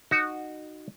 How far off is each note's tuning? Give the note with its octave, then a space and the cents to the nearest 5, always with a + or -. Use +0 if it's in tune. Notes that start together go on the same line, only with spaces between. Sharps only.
D#4 -20 F#4 +0